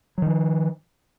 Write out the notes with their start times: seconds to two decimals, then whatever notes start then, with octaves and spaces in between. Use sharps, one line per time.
0.18 F#3
0.22 D#3
0.26 F3